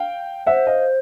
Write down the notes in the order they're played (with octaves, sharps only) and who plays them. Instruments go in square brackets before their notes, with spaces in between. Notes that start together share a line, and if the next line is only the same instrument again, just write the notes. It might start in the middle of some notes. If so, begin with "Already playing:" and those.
Already playing: [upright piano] F5 G5
[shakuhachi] C5 [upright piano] E5 F#5
[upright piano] D#5 F5